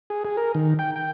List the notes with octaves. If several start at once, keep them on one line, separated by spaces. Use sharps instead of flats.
G#4
G#4
A#4
D#3
G5
G5